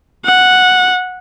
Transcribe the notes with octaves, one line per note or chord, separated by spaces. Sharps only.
F#5